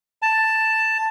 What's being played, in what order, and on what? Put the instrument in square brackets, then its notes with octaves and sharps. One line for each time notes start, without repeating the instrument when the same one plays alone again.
[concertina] A5